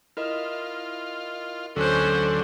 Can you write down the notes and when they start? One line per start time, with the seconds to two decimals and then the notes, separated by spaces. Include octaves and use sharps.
0.17 E4 F4 A#4 D#5
1.76 D2 D3 F#3 C#4 A4 C5 F#6